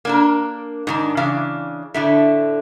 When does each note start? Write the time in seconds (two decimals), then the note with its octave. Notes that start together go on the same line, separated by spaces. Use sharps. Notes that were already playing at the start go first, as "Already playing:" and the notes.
0.05 A#3 D4 A#4
0.87 G#2 D#3 D4
1.17 C#3 E3 D4 F5
1.94 A2 D3 A3